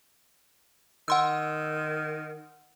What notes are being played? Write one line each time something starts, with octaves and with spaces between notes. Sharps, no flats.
D#3 F#5 C6 E6